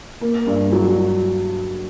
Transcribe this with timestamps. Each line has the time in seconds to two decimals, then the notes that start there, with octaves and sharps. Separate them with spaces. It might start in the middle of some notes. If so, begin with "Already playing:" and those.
0.21 A#3
0.47 G2
0.72 F#3